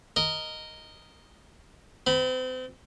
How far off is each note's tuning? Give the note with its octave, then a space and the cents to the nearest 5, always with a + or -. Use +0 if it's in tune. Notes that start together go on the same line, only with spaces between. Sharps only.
A#4 +0 D#5 +0
C4 -35 B5 +0